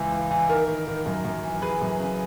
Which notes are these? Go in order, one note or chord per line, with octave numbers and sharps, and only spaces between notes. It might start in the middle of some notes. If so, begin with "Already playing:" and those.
Already playing: C#2 E3
E3
E3
D#3 A#4
D#3
D#3
F#2
F#2
E3
E3 G#4 B4
F#2
C#3